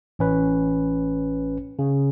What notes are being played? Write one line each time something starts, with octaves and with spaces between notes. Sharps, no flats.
A1 C#4 B4
C#3